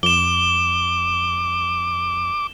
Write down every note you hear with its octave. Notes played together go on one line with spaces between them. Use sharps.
F2 D6 E7 G7